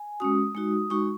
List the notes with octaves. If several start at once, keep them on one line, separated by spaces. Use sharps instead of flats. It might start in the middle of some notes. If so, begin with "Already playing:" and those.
Already playing: G#5
G#3 C#4 F#4 D#6
G#3 D#4 F#4
G#3 D#4 F#4 C#6